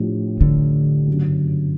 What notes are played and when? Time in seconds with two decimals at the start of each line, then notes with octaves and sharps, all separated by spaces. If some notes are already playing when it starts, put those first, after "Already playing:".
Already playing: A2 F3 A3 D4 G4
0.41 D3
1.07 G1 F#2 C#3 F#3